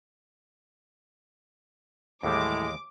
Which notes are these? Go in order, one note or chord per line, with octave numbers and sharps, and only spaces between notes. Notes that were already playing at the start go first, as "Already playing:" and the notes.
D#2 A2 E3 G3 G#3 D6